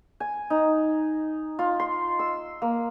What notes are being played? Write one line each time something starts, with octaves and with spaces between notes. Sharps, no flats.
G#5
D#4
F4
C6
E6
A#3